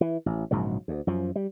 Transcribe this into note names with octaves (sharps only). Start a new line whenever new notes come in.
E3
A1
A#1 G#2 C#3 F#3
D2
F#2 F3
G3